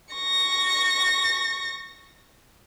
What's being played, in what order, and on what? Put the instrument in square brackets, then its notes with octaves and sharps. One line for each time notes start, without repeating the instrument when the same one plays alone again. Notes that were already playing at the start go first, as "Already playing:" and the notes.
[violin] C#6 A#6